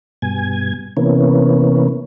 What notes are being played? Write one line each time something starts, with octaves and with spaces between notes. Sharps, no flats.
G2 B2 G#5
C3 E3 A#3 B3 C#4